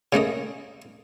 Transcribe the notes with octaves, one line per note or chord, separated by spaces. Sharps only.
C#3 A3 A#3 D#5